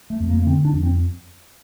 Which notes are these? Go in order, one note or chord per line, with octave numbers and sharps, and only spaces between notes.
A3
F2
A#3
A#3
D3 C4
D4
F2
C4